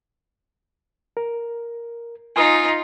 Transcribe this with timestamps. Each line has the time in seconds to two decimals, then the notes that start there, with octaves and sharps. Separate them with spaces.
1.17 A#4
2.36 D#4 F4 G#5 C6 D#6